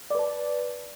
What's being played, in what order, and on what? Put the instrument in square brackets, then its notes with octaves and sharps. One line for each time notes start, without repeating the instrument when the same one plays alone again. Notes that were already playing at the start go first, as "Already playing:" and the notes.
[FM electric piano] D5
B4
A5